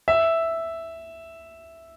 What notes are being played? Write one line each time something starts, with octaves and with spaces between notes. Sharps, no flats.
E5